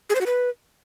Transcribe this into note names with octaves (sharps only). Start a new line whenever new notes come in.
G#4
C5
F#4
B4